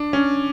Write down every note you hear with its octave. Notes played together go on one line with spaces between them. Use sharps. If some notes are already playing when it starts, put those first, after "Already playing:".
Already playing: D4
C#4